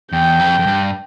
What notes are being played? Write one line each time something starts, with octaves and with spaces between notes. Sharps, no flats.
E2 G5
F2
F2
G2